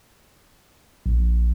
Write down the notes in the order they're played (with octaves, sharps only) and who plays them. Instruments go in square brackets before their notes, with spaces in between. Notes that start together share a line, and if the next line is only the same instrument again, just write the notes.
[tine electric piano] A#1